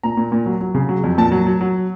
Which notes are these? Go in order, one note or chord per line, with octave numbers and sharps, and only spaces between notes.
A#2 A#5
A#2
A#2
F#3
F#3
C#3
F#3
F2
A#2 A5
F#3
F#3
F#3